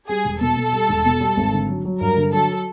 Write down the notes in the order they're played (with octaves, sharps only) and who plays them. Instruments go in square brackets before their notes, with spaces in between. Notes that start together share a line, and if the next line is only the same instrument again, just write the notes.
[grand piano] G3 [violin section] G#4
[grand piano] E1
[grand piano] B2 [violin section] A4
[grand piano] B2
G3
E1
B2
G3
G#1
D3
F#3
F#3
[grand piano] G2 [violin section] A#4
[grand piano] D3
[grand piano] F#3 [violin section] A4